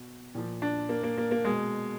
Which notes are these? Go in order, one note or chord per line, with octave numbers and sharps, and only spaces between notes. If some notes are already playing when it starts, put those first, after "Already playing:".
Already playing: B2
A#2 F3
D4
A#3
A#3
A#3
A#3
B2 G#3